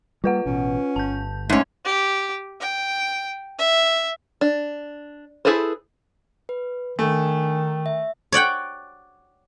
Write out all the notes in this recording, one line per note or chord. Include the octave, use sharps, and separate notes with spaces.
G3 A#3 F4 B4 F#5
A1 B2 C#4
G1 A5 G6
G#2 A3 C#4
G4
G5
E5
D4
E4 G#4 A4 B4 C5
B4
D#3 A3 D4 G#5
E5
C#5 D5 F#5 G5